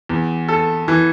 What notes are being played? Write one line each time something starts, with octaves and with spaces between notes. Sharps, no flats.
E2
A4
E3